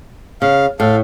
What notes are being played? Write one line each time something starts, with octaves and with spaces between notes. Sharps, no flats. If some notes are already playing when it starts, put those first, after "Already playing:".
C#3 F5
A2 A4 F5